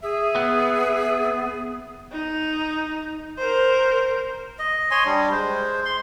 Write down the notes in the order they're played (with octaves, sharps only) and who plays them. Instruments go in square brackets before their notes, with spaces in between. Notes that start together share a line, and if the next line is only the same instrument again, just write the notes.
[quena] G#4 [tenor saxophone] E5
[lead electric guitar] B3
[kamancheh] D#4
A#4 C5
[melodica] D#5
C#5 D#5 G#5 C6
G3 D4
G#3 C5
C6